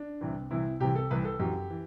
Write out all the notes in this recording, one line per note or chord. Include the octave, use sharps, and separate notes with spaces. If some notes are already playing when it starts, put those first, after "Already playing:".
Already playing: D4
C2 C3 E3
C2 C3 E3 E4
C2 C3 E3 G4
A4
C2 C3 E3 B4
A4
F#2 E3 G4
E3